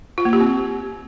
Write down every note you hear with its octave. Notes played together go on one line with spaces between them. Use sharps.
F4
A#3
G4
C4